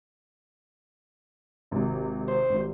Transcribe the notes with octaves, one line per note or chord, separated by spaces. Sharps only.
G#1 C3
C5
G#1 G3